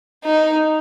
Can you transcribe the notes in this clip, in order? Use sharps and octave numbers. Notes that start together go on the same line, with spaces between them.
D#4